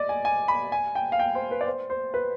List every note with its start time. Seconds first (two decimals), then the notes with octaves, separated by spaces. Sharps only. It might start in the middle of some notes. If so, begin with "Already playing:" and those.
Already playing: D5 D#5
0.09 G#5
0.25 G#5
0.48 B5
0.72 G#5
0.95 G5
1.12 F5
1.19 G5
1.35 C5
1.51 B4
1.61 D5
1.66 C5
1.90 C5
2.14 B4